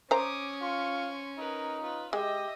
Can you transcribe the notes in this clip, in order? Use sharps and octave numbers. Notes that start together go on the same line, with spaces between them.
C#4 C5 A#5 D6 D#6
F4 C6 C#6
D#4 A#4 B4
F4 B4
G#3 G4 D#5 E5